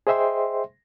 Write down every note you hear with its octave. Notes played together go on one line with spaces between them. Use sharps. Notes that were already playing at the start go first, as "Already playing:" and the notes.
G#4 C5 D#5 E5 G5 C6